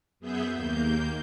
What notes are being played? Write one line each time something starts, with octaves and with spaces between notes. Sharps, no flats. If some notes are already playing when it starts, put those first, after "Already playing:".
F#2 B3 G#4 E5 G6
D#2 A#3 G6